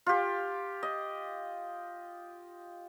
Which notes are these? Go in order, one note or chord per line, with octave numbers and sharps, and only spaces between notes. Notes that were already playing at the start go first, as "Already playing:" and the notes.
F4 G4
D#5